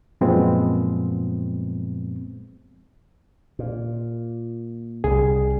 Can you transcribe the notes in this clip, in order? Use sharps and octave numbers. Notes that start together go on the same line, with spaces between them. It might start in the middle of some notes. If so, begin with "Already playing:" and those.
F#2 A#2 F3 G#3 B3 C4
A#2
C2 G3 G#4